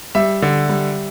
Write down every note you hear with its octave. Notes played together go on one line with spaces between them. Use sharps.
G3 E5
D3
G3